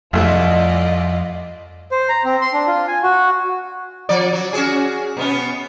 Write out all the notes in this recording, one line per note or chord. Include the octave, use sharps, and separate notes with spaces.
C2 F2 A3 E4 F4 D5 D#5
C5
A#5
C4
C6
D4
F4
G#5
F#4
F3 D5
F#3
C#4 F#4 G#4
B2 B3 C#4